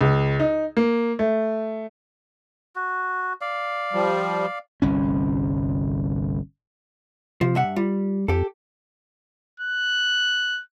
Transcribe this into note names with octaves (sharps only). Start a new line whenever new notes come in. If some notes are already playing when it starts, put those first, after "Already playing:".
C#2
D#4
A#3
A3
F#4
D5 F5
F3 G3
G1 C2 C#4
C3 F3
G2 E5 F#5
G3 F4
F2 G4 A4
F#6